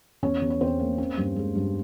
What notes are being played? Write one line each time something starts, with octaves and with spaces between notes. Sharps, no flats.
E2 C#4 C#5
E2
C#5
E2 C4 C5
A#3
C#4
G2
G#3
G2